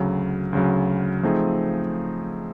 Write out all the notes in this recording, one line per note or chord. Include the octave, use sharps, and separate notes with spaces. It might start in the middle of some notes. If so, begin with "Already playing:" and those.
Already playing: D2 C#3 F#3
D2 C#3 F#3
F3 A3 C4 D#4 G#4